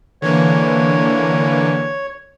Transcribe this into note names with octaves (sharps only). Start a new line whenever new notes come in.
D3 E3 A#3 C#5